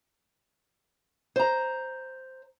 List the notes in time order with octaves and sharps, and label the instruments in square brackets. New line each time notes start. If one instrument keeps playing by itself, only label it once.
[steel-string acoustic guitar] C5 A#5